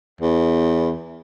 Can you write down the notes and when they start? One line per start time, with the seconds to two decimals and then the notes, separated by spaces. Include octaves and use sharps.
0.21 E2